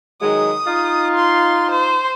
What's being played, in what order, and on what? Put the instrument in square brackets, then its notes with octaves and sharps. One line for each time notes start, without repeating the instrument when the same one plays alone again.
[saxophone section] D#3 F#3 G#3 [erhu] D#6
[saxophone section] D#4 F4
[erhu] C6
C5